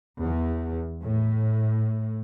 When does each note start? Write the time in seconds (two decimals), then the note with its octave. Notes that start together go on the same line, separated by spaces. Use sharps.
0.22 E2
1.04 A2